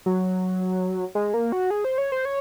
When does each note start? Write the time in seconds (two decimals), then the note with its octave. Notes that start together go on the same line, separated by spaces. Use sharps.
0.06 F#3
1.15 G#3
1.34 A#3
1.52 F#4
1.70 G#4
1.84 C5
1.98 C#5
2.12 C5
2.25 C#5